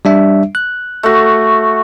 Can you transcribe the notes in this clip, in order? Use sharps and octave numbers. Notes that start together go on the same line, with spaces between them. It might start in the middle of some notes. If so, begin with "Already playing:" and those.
G3 D4 E5
F#6
A3 F#4